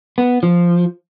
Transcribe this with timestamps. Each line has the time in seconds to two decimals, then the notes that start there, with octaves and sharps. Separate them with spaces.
0.18 B3
0.43 F3